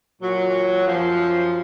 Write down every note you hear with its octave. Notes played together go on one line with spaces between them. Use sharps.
A#2 F#3
F#2 F3